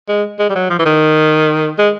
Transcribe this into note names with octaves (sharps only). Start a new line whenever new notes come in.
G#3
G#3
G3
F#3
F3
E3
D#3
G#3